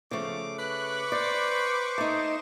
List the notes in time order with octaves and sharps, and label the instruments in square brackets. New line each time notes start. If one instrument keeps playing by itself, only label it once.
[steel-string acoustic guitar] C#3 A3 [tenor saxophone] F3 [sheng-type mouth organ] D6
[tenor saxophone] B4 [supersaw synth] C#6 D6 [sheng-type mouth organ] F#6
[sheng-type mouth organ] C5 [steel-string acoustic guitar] D5
[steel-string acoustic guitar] A3 D#4 [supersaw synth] D#5 E7